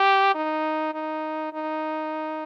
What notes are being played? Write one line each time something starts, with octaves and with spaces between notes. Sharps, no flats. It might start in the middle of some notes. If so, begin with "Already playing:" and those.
Already playing: G4
D#4
D#4
D#4